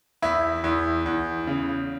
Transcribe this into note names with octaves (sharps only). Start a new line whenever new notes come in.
E2 E4
E2
E2
C#3